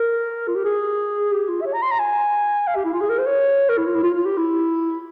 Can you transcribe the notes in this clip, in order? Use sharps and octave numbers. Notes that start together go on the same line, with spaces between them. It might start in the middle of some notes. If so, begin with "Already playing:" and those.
Already playing: A#4
F4
G4
G#4
G4
F4
E5
C#5
A#5
C6
A#5
G#5
F5
G4
E4
F4
G#4
A#4
C5
C#5
A#4
E4
F4
E4
F4
F4
G4
E4